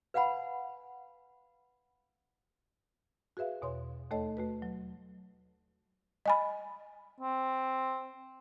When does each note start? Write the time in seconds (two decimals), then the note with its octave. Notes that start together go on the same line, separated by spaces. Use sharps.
0.14 B4 F5 F#5 G#5 B5
3.37 F#4 G#4 B4 E5 F5
3.62 E2 B2 C#5 C6
4.11 D#2 A3 A4 C#5 D#5 A5
4.37 A3 F#4 B4
4.62 F#3
6.26 D#5 G#5 B5
7.20 C4